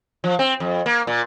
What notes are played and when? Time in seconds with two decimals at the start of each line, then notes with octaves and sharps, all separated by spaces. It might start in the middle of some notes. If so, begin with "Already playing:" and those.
0.24 F3
0.39 C4
0.60 F2
0.86 A#3
1.07 A#2